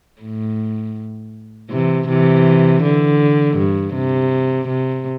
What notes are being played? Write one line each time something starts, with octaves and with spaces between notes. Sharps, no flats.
A2
C3 E3
C3 E3
D3
G2
C3
C3